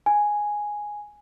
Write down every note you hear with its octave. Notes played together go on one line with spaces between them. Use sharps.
G#5